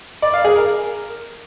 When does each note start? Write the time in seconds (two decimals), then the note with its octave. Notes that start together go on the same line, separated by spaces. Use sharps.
0.22 D5
0.33 F5
0.45 G#4
0.56 A#4